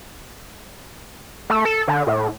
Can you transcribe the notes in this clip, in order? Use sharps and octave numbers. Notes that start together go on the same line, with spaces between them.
A3
A4
D3
A2